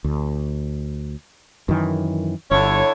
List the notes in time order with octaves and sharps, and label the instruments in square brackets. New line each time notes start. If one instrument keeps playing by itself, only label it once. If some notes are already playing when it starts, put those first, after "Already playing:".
[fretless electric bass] D2
F#2 D#3 E3
[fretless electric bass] G1 [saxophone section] D3 E4 C#5